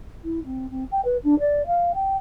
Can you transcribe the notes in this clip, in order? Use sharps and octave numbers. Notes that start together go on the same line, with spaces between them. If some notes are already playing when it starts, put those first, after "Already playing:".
E4
C4
C4
G5
B4
D4
D5
F5
G5